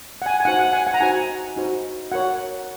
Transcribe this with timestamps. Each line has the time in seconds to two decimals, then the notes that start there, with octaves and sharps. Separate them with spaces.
0.22 F#5
0.26 G#5
0.40 G#5
0.45 D#4 F#4 C5 F#5
0.59 F#5
0.73 G#5
0.87 F#5
0.94 A#5
1.00 D#4 F#4 C5 G#5
1.57 D#4 F#4 C5
2.12 F#4 A#4 C#5 F#5